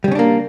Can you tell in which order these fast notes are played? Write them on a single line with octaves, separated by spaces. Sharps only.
G3 C#3 C#4 D4 A#3